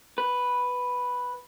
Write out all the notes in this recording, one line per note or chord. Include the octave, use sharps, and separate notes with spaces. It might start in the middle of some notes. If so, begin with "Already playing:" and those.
B4